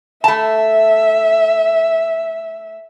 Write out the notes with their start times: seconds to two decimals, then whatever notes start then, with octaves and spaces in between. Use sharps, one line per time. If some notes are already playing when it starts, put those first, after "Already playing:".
0.24 A3 E5 A5